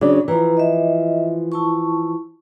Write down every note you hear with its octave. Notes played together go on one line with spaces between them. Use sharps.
C#3 F#3 D4 D6
E3 F3 E4 B4 A#5
D#5 E5
E4 A5 C#6